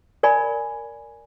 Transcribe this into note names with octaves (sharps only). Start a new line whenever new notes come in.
A#4 D5 G#5 B5